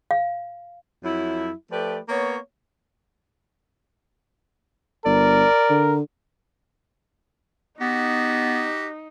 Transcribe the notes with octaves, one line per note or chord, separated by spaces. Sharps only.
F5
F2 F#3 E4
F3 A3 G4 B4 D5
A#3 B3 C#5
G1 A#4 D5
D3
B3 D#4 F#4 G4